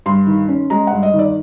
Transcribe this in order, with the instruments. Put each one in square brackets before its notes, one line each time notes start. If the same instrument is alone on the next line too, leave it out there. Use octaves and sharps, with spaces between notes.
[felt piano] G2 C6
D#3
C#4
G#3 A#5
G2 F#5
D#5
D#3
D5